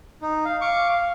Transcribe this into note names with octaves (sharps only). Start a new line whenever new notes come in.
D#4
F5
F5 C#6 D6
F5